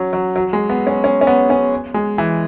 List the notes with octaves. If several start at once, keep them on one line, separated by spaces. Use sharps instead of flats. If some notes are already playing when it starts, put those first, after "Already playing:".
Already playing: F#3 C#4
F#3
F#3
G#3
B3
C#4
C#4
C#4
B3
C#4
G#3
E3